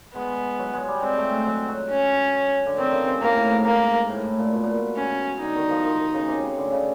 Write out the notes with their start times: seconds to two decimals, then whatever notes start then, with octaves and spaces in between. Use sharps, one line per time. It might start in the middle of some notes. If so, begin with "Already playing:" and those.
0.15 G#3 B3
0.59 F#3
0.73 G#3
0.88 G3
1.02 G#3 C4
1.18 A3
1.32 G#3
1.46 F#3
1.68 F#3
1.91 C#4
2.66 D3
2.78 D#3 C4
2.92 C#3
3.07 C3
3.22 A2 A#3
3.37 A2
3.51 G#2
3.65 A#3
4.09 A2
4.24 A2
4.38 A#2
4.53 B2
4.64 A#2
4.75 B2
4.97 C#4
5.41 D3 D#4
5.56 D#3
5.70 F3
5.84 D#3
5.99 D#3
6.14 C#3
6.28 C3
6.44 C#3
6.58 D3
6.72 C#3